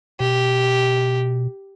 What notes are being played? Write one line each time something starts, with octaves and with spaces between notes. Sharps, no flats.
B2 G4